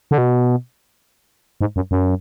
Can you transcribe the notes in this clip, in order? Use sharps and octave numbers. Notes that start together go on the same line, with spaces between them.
D3
B2
G#2
F#2
F#2